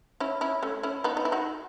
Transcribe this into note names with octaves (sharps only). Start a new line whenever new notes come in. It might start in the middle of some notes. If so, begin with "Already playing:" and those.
C#4 E4
C#4 E4
A3 C#4
C#4 E4
B3 D#4
D#4
E4
D#4 F#4